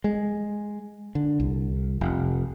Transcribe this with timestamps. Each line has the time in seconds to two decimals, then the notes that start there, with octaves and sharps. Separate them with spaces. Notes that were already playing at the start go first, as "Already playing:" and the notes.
0.04 G#3
1.15 D3
1.40 C2
2.01 F1